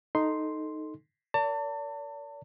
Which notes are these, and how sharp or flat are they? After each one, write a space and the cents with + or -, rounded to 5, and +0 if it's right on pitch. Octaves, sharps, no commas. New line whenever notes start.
D#4 +0 A4 +0 C6 +0
A#4 +0 D5 -40 A5 +35